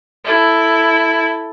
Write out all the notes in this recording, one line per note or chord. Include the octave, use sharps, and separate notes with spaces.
E4 A4